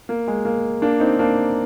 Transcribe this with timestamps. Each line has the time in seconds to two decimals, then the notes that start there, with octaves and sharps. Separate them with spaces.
0.09 A#3
0.28 G#3
0.45 A#3
0.82 A#3 D4
1.00 C4 D#4
1.19 A#3 D4